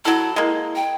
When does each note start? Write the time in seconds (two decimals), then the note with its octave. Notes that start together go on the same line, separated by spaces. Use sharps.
0.05 F#3 E4 A4
0.36 G#3 A#3
0.76 G5